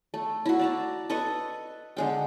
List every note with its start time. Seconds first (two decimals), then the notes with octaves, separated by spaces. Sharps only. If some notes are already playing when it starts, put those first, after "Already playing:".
0.14 A3
0.46 E4 F#4
0.59 D5 A5 A#5
1.10 A4 B4 D#5 C#6
1.97 D3 G#3 G5